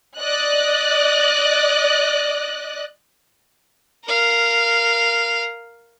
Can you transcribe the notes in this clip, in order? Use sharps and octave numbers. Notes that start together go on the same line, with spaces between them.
D5 D#5 F#6
A#4 F5